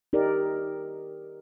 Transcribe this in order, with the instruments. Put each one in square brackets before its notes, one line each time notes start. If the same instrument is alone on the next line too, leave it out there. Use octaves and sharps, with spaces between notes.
[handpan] D#4 G4 A#4 D5